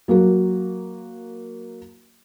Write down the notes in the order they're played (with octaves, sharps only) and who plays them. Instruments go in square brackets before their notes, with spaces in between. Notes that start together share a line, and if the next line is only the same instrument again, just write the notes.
[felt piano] F#3 A#3 F#4